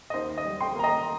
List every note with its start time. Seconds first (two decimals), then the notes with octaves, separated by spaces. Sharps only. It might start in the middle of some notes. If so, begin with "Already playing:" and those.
0.10 D#5
0.14 D#2 C5
0.38 D#5
0.45 G3
0.60 G5 C6
0.75 A#3 A#5
0.84 D#5 G5